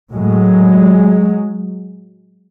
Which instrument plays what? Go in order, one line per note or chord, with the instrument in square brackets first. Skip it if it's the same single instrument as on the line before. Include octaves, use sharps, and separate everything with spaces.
[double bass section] A2 F#3 G#3